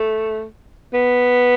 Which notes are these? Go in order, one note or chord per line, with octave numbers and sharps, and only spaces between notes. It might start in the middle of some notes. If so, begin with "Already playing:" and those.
Already playing: A3
B3